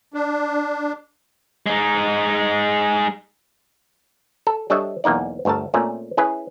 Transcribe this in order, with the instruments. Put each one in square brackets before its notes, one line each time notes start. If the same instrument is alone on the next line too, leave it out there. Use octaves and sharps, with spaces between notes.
[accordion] D4
[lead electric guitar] G#3 D#4
[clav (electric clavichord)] A4
G3 D4 A4 C#5 D#5 E5
B1 E2 A#3 D#4 D5
G1 D2 A3 A#4 A5
A#2 A3 C4 C#4 D5
C#4 E4 G#4 B4